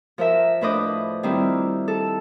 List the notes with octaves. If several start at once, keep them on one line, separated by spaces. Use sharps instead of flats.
F3 A#4 E5
A2 D4 B4 C5 D#5 D6
D#3 G3 C4 E4 F4
A4